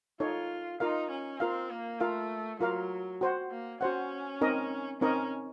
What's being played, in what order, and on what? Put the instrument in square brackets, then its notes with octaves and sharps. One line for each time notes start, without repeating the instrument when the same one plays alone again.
[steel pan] D#4 A4 C#5 [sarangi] F4
[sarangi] D#4 [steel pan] F4 A#4 F5
[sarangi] C#4
[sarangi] C4 [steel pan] F4 A#4 F5
[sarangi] A#3
[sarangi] A3 [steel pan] F4 A#4 F5
[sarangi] F#3 [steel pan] F4 A#4 F5
[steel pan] F#4 C5 F#5
[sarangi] A#3
[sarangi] C#4 [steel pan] F#4 C5 F#5
[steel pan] C4 D#4 A#4 D#5
[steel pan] C4 D#4 A#4 D#5 [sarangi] C#4